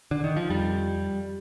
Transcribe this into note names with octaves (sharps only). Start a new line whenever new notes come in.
D3
D#3
F3
F2 G3